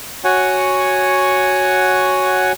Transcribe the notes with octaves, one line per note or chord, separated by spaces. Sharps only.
F#4 C#5 F#5 G#5